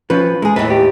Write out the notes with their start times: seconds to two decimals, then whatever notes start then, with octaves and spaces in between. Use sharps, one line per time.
0.10 F3 C#4 F4 B4
0.42 E2 G#3 G#4
0.56 D#2 A2 B4
0.70 G4